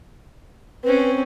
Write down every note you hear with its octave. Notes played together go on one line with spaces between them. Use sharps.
C4 C#4 B4